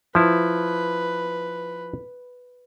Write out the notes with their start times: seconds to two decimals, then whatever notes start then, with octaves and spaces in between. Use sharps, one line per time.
0.15 F3 E4 B4